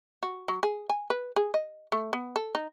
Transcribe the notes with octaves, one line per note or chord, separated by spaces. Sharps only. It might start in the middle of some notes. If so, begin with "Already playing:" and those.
F#4
F#3
G#4
G#5
B4
G#4
D#5
A3
B3
A4
D#4